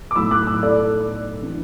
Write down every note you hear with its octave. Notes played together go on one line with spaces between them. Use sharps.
D6
B1 A2 A3 B5 E6
D6 F#6
B5 E6
A4 D5
E3 D4